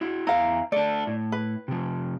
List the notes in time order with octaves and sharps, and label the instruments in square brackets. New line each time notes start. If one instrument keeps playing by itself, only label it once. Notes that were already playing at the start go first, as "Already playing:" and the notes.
[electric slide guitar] E4 F#4
[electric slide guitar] E2 E3 A#5 [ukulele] E4 F5
[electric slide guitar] A3 D4 [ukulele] D5
[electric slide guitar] A2
[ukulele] B4
[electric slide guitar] C3 F3